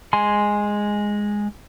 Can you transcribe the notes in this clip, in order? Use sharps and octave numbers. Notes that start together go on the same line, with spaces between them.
G#3 G#5 C6